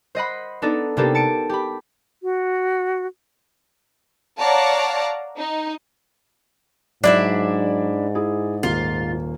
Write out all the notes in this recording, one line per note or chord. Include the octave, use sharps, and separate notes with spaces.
C5 D#5 F#5 B5
B3 D4 D#4 A4
C3 A#3 B3 D4 G4 A4
A5 C#7 D7
G4 B5
F#4
C#5 D5 F5 F#5 A5 A#5
D#4
G#2 F#3 D4 E4 D5 E5
E4 G#4
D#1 A#3 F4